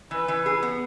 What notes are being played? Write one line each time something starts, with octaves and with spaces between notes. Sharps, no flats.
E3 B4
E3
G#4
B3